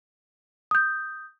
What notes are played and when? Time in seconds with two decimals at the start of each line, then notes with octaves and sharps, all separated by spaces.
0.71 D#6 G6